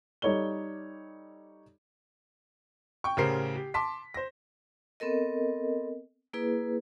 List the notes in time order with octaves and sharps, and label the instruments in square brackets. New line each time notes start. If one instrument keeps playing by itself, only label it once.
[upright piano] G3 D#4 A4 C#5 D5 G7
G5 C#6
A1 C#3 G4 A#4 C5 C7
G4
A5 C6 D6 B6
C5 A#6
[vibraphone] B3 C4 A4 A#4 D#5
A#3 E4 G#4 B4